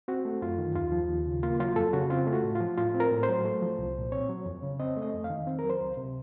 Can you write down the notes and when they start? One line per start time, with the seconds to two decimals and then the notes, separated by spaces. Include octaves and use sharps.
0.08 C4 F#4
0.25 A3
0.42 F#2 F4
0.59 D#3
0.75 D#2 F4
0.92 F3
1.09 D#2
1.26 C#3
1.43 A#3 F4
1.60 F#3 F4
1.76 F2 A4
1.93 C#3 F#4
2.10 C4 F4
2.27 A3
2.33 F#4
2.44 A2
2.55 F4
2.61 F3
2.78 A2 F4
2.94 C4
3.00 A#4
3.11 A2
3.23 C5
3.28 F#3
3.45 A3
3.62 F3
3.79 C2
3.95 A#2
4.12 C4 C#5
4.29 F#3
4.46 F2
4.63 C#3
4.80 C4 D#5
4.97 A3
5.02 D#5
5.13 F2
5.24 F5
5.30 D#3
5.47 C4
5.59 A#4
5.64 F#3
5.70 C5
5.81 C#2
5.97 C3